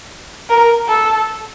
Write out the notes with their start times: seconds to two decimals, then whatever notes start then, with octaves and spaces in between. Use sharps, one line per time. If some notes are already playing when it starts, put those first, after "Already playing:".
0.49 A#4
0.88 A4